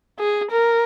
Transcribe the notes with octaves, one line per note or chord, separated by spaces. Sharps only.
G#4
A#4